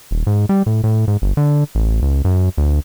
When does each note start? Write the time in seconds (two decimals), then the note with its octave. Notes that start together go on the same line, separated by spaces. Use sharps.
0.11 D#1
0.27 G#2
0.49 G3
0.66 A2
0.84 A2
1.08 G#2
1.22 G1
1.37 D3
1.75 A1
2.02 C#2
2.25 F#2
2.58 D2